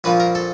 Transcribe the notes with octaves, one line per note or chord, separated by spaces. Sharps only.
A#1 A#2 F3 B4
A#4
A4